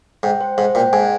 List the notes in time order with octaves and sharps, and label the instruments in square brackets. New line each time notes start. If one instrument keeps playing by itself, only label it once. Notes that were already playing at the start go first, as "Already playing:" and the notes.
[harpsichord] G#2 [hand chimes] G5
[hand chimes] C5
[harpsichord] G#2 [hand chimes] C5
[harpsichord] A#2 [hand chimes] G5
[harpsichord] G#2 [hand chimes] G#5